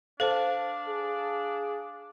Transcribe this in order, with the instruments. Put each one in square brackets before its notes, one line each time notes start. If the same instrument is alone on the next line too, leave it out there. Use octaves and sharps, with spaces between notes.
[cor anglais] D4 [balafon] A4 C5 [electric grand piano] F5 A5
[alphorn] G#4